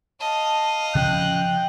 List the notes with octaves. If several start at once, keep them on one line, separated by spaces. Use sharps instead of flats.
D#5 F5 A5
C#3 F3 C#4 G5 F#6